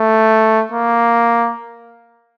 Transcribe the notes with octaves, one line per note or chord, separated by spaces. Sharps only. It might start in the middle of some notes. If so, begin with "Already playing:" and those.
Already playing: A3
A#3